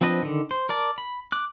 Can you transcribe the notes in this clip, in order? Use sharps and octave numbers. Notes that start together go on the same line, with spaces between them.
F3 C4 D4 B4 D#5
D3 D#3
C5
A#4 D5 A5
B5
D6 F#6